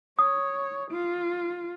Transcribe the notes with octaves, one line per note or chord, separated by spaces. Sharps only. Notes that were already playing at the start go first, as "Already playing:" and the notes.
C#5 D#6
F4